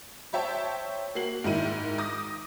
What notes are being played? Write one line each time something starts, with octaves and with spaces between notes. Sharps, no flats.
C5 C#5 E5 G5 A5
A#3 F#4 C7 F#7
G#2 D#3 E4 D#7
D6 D#6 A#6